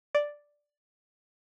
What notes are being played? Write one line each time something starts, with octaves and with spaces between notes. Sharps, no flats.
D5